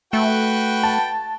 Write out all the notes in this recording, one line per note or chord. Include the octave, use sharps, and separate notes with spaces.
A3 F#4 B4 G5
A5